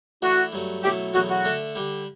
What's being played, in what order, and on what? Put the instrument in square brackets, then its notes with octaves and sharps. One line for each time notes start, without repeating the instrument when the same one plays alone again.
[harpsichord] E3 A3 D4 [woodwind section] F#4
[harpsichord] G2 F#3 A3
[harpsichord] B2 F#3 A3 E4 A4 [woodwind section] G4
[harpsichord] E2 B2 F#3 A3 [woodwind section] F#4
[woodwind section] F#4
[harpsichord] D3 A3 D4 A4 E5
D3 G3 D4 G4